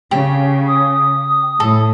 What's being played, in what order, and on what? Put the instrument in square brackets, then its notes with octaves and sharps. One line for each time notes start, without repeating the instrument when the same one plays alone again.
[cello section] C#3 [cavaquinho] G4
[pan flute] D#6
[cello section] A2 [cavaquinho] A4